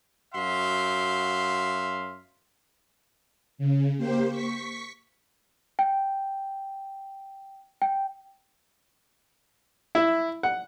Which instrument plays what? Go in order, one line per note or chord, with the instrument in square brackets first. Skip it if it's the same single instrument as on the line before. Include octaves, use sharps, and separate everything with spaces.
[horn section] F#2 F#4 E5 F5 C6
[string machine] C#3
A#3 G4 C5
C#6 B6
[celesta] G5
G5
[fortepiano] E4
F#5